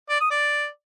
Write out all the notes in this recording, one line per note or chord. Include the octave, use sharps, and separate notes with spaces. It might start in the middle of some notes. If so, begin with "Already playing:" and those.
D5
D#6
D5